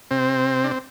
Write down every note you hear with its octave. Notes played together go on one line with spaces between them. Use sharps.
C3 C4
D4
C4